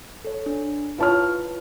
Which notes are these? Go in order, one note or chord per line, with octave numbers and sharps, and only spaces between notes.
A4 C#5
D4
E4 F4 B4 C#5 A5 F6